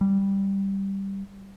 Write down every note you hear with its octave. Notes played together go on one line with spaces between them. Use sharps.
G3